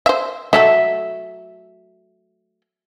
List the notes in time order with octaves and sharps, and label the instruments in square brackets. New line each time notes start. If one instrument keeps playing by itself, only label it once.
[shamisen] C5 E5
[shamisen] F#3 A3 A4 [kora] E5